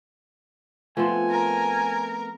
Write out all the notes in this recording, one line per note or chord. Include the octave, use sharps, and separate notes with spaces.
F3 A3 B3 C4 G#5
A#4